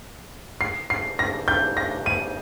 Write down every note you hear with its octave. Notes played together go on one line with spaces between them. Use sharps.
C7
C7
A#6
G6
A#6
D#7